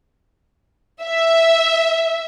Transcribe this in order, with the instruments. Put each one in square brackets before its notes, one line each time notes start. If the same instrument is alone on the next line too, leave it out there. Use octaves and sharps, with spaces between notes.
[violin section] E5